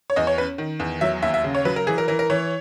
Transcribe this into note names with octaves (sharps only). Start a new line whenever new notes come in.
C#5
E2 D#5
C#5
C#4 B4
D#3
E2
F#3 E5
D#2 E5
E5
C#3
C#5
F#3 B4
A#4
E3 G#4
A#4
E3 A#4
A#4
E3 C#5